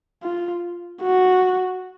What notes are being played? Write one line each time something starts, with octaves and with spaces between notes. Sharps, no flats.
F4
F#4